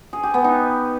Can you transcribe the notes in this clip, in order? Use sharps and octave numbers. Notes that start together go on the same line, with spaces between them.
G#4
G4
B3
D#4